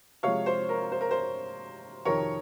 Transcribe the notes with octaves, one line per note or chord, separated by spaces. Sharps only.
C3 F3 G#3 C#5 F5
C5
A#4
C5
A#4
C5
F2 C3 D#3 A#4 C#5